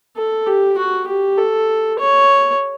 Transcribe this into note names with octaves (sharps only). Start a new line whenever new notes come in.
A4
G4
F#4
G4
A4
C#5